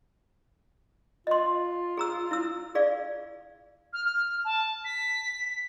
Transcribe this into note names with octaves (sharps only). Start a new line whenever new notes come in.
F4 D#5 C6
G#4 A#5 E6
E4 E6
G#4 D5 F5
F6
F6
A5
B6